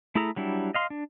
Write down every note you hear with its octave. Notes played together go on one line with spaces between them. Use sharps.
A3 E4 G#4 A4 A#5
F#3 G3 D4 E4
D#5 F5 C6
D4